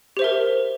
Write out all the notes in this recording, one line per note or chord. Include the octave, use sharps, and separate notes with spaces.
G4 A#4 C5 E5